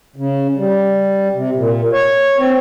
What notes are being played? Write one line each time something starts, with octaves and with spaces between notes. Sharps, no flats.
C#3
G3
C3
A#2
C#5
C4